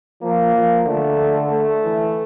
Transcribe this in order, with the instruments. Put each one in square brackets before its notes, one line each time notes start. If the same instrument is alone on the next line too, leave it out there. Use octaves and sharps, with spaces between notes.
[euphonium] F3 [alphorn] A#3
[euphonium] F3
[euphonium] D3 [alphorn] A3
[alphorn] A3
[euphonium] E3